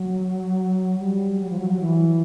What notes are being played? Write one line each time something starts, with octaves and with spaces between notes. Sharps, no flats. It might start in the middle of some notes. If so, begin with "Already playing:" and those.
Already playing: F#3
G3
F#3
F3
F#3
F#3
E3